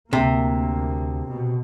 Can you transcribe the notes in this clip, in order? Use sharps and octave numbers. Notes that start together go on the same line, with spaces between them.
D2 C3 A#3
B2